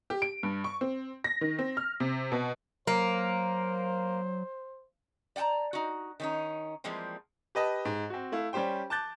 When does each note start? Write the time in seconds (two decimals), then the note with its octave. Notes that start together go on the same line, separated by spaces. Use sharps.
0.10 G4
0.22 D7
0.43 G2
0.64 C#6
0.81 C4
1.24 A#6
1.41 D#3
1.59 C4
1.77 F6
2.00 C3
2.32 B2
2.87 F#3 A#3 C5
5.36 D5 F#5 G5 A5 A#5
5.73 D#4 F#4
6.20 D#3 C#4 D#4
6.84 E3 F3 G3 G#3 A#3 C4
7.55 G4 B4 D#5 A5
7.85 G#2
8.10 C4 F#4
8.32 A3 E4 F5
8.53 G3 C#4 G4 C5 G5
8.90 A5 D6 F#6 G6 A6